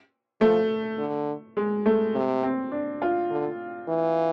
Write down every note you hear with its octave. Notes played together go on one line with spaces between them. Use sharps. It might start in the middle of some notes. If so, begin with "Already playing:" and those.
F3 A3
D3
G#3
A3
C3
C4
D4
F4
D3
E3